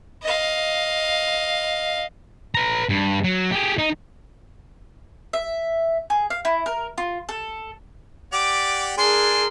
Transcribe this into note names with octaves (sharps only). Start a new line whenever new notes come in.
D#5 F5
B4 A#5
G2
F#3
G4 G#4
D#4
E5
G#4
F5
E4
A#4
F4
A4
G4 D5 F#5 D6
D4 G#4 A#4 G#5 C6